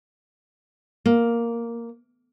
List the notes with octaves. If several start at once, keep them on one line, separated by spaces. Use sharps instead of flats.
A#3